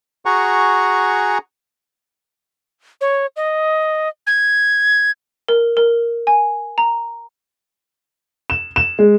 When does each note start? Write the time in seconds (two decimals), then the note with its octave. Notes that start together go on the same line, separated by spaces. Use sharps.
0.26 F#4 G#4 F#5 G#5 A#5 C#6
3.01 C#5
3.36 D#5
4.27 G#6
5.49 A#4
5.77 A#4
6.27 G#5
6.78 A#5
8.50 E7
8.76 E7
8.99 G#3